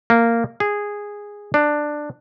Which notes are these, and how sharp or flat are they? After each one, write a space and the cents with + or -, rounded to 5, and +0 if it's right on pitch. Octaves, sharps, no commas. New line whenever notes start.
A#3 -10
G#4 -10
D4 +10